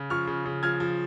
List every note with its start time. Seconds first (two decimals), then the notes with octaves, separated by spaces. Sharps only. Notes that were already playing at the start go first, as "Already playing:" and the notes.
Already playing: C#3
0.10 F3 C#6 F6
0.27 C#3
0.46 C#3
0.63 F3 F6 G#6
0.80 F3